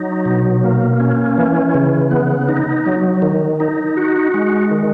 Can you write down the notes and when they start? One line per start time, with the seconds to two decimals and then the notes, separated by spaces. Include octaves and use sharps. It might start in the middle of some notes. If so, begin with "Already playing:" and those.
Already playing: F#3 D#4
0.25 B2
0.63 A#3
1.00 C#4
1.38 E3
1.74 C#3
2.11 B3
2.49 D#4
2.86 F#3
3.22 D#3
3.60 D#4
3.97 F#4
4.34 G#3
4.71 D#3